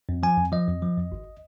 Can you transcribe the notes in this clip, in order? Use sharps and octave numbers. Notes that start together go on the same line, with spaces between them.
F2
F3 G#5
F2
F3 D#5
F2
F3
F2
G#1